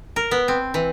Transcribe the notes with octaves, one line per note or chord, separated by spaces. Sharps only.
A#4
B3
C4
E3